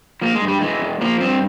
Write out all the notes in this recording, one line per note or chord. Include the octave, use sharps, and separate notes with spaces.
F3 A#3
G#3
G2
G3
E3 G#3
E2
F3 A#3
G2 C4